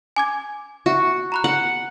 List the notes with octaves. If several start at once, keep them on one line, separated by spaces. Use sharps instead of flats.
G#5 D6 G#6
F#4 E5
A#5 B5 F#6
F#5